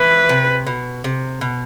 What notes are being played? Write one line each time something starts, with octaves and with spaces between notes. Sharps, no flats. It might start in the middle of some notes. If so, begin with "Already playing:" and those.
Already playing: E3 B4
C3
B2
C3
B2